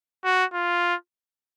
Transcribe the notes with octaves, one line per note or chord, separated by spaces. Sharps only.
F#4
F4